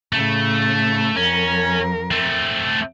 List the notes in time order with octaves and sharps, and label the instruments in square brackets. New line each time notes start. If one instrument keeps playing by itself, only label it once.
[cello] A2 C#3 [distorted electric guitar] A3
[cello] F2 A#4 [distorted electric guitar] C#4
[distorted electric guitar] A3 C4